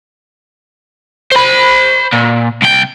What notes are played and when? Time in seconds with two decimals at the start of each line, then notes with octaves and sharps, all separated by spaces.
1.32 C5 B5
2.13 A#2
2.62 C2 G5